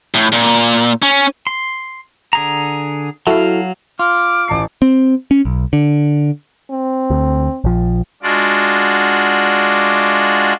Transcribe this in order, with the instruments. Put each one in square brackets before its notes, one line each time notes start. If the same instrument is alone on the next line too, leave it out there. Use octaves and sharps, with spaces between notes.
[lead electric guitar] A2
A#2
C#4
[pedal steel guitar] C6
D3 G#4 A#5
[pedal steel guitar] F#3 F5 [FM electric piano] E4 F#4 A4
[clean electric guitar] F4 [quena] D6 [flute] F6
[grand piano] A1 A5 C7
[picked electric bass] C4
C#4
B1
D3
[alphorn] C4
[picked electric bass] D2
A#1 F3
[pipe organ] G#3 D4 F4 F#4 D5